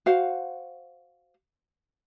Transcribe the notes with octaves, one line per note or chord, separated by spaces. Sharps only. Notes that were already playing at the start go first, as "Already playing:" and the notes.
F#4 C5 F5 F#5